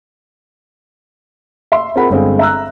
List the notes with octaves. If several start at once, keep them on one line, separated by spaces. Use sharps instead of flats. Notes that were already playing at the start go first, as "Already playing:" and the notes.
E5 C6
C4 F4 G#4 A#4 F#5 B5
G1 D3 G#3 C4 F5
E5 A#5 E6 F#6